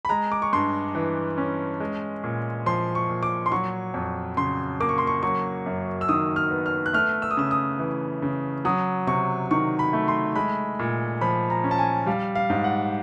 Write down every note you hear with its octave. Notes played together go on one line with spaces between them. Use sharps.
B5
G#3 A#5
D6
C#6
G2 C6
E3
C#4
G#3
A#2
F3 C6
C#6
A#2
D6
C6
F#3 C#6
F2
C#3 C6
A#3 D6
C#6
C6
C#6
F#3 C#6
F#2
E6
D#3 D#6
F6
B3
F6
F#6
A3 F6
E6
D#6
C#3 E6
D#6
E3
C#3
F#3 D#6
C3 C#6
D#3 C#6
B5
A3
C6
G#3 B5
A#2
F3 B5
A#5
C#4
A5
G#5
G3 F5
F5
G#2
F#5